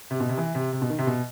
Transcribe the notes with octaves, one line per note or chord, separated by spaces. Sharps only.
C3
B2
C3
E3
C3
C3
B2
D#3
C3
B2